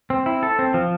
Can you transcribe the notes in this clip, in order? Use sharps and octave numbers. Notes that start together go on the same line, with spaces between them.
C4
E4
A4
C4
F3